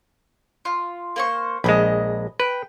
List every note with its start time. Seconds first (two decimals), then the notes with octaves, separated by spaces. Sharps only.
0.65 F4
1.16 A#3 C5 C#6
1.64 A#1 G#3 D#5 B5
2.40 B4 G5